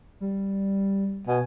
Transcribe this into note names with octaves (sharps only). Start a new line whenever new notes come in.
G3
B2 G#5